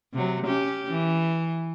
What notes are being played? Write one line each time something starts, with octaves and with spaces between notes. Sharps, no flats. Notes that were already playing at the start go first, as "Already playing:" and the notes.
C3 F#3
C#4 G4
E3